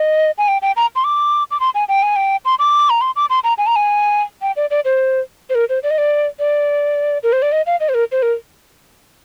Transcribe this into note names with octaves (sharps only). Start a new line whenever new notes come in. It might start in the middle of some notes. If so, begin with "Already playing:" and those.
Already playing: D#5
G#5
G5
G5
A#5
C6
D6
D6
C6
G#5
G5
G#5
G5
C6
D6
A#5
C6
D6
C6
A#5
G#5
A#5
G#5
G5
D5
D5
C5
C5
A#4
C5
D5
D#5
D5
D5
A#4
C5
D5
D#5
F5
D#5
C5
A#4
C5
A#4